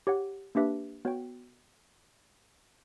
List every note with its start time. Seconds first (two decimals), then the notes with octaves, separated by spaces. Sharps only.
0.07 G4 C#5 F#5
0.55 A#3 D4 G4 B4 E5
1.05 B3 F#4 C#5 G5